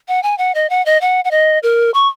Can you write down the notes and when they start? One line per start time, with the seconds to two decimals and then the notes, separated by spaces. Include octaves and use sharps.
0.08 F#5
0.23 G#5
0.38 F#5
0.55 D#5
0.70 F#5
0.86 D#5
1.01 F#5
1.25 F#5
1.31 D#5
1.63 A#4
1.94 C#6